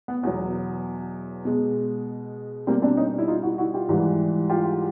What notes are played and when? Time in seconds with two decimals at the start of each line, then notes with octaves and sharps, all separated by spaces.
0.08 B3
0.23 E2 B2 F#3 B3
1.45 B2 G#3
2.67 B2 G3 A#3 C4
2.82 C4 D4
2.97 C#4 D#4
3.18 E4
3.28 D#4 F4
3.43 E4 F#4
3.58 E4 F#4
3.74 F4 G4
3.89 G#2 E3 G3
4.49 F4 G4